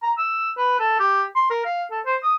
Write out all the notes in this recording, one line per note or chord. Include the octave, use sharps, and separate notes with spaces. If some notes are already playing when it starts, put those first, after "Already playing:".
A#5
E6
B4
A4
G4
C6
A#4
F5
A4
C5
D#6